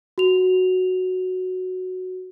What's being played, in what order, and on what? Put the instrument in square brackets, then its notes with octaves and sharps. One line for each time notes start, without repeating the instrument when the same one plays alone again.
[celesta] F#4 F7